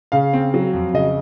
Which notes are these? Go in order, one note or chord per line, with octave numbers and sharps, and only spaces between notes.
C#3 F5
C4
F#3
F2
C#3 D#5